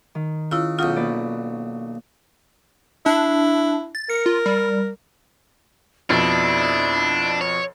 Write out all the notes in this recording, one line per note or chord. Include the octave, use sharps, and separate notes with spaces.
D#3
C#3 E4 F4
B1 C#3 F4 F#5 D#6 G6
A#3 B4 D5
D4 E4
A6
A#4 C#7
F4
G3
F2 B2 D4 E4 A6
C#5